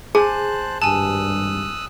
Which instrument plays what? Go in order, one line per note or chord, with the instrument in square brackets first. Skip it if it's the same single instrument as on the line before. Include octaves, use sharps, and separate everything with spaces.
[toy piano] G#4 [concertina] C5 A5 F#6 [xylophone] G#5
[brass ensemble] G#1 G2 [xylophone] G#5 A5 [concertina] D#6 E6 F#6